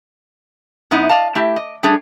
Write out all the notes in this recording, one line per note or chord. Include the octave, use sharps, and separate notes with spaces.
F#2 B3 D#4 E4
D5 D#5 F5 A5
A3 E4 G4
D#5
G3 A3 D4 G#4 C#5